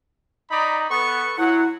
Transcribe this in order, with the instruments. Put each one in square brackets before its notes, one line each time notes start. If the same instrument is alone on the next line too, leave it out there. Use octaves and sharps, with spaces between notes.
[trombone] D#4 [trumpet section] D5 A#5 B5
[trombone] B3 [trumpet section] A4 B4 C#6
[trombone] F#3 [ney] E4 [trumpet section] F#5